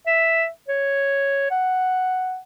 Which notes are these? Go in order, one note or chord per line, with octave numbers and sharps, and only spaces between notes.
E5
C#5
F#5